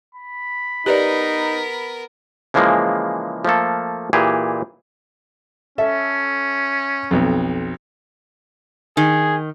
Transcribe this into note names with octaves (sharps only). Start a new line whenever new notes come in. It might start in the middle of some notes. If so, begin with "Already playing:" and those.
B5
B3 D#4 G4 A#4 B4 D5
C#3 E3 F3 G#3 A#3
F3 A3 A#3 A4
A#2 E3 G4 G#4
C#4 A4 E5
B1 F2
D#3 G#4